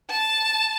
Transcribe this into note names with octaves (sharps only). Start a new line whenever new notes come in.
A5